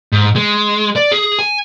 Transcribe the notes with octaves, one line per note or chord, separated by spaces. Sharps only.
G#2
G#3
D5
G#4
G#5